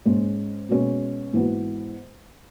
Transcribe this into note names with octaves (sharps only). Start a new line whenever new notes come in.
G#2 G#3 C#4
B2 G#3 C#4
G#2 E3 B3 F#4